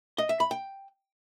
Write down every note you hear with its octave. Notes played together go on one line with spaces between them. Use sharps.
D#5
E5
B5
G5